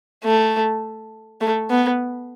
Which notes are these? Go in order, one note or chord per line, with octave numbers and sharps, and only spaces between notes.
A3
A3
B3